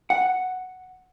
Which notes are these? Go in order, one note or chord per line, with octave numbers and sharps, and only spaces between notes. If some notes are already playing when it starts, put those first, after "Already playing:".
F#5